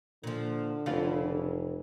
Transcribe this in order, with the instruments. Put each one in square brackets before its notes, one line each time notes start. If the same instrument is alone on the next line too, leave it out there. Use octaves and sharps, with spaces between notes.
[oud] A#2 F3 [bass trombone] D3
[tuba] F1 [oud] C#3 E3 F4